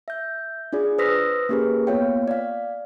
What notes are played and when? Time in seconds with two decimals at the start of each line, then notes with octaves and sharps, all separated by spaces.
0.08 E5 G6
0.73 D4 F4 G#4 D5
0.98 B4 C5 D#6 E6 A#6 B6
1.49 A#3 C#4 G4 G#4 A#4 B4
1.87 A#3 B3 F4 C#5 F5 G5
2.28 D5 F5